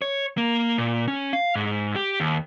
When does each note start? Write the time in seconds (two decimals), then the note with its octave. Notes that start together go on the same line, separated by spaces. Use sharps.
0.02 C#5
0.37 A#3
0.78 A#2
1.08 C#4
1.33 F5
1.55 G#2
1.96 G4
2.20 D#2